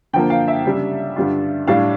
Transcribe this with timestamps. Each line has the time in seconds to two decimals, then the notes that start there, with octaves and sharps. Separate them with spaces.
0.13 D3 F3 A#3 G5
0.30 F5
0.48 E5
0.65 C#3 G3 D4
1.16 G2 D3 G3 D4 F4
1.67 A2 G3 D4 F5